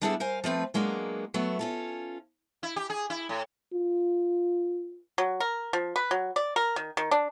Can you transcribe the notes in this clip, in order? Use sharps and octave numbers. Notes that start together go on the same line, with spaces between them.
G3 B3 D4 E4 G#4 A4
A#4 C5 F5 G#5
F3 A3 C4 B4
F#3 G#3 A#3 B3 D4
F#3 A3 B3
C#4 F4 A4
E4
G4
G#4
E4
A2
F4
F#3
A#4
F3
B4
F#3
D5
A#4
D#3
D#3
D4